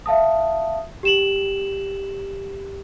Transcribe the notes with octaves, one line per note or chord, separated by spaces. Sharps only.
E5 F5 A5 D#6
G4 E7 F#7